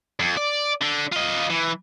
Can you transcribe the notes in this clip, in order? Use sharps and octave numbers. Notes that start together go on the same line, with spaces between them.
F2
D5
D3
F4 D#5
E3